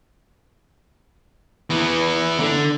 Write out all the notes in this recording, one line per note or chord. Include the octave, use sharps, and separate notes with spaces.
E3 B3
D3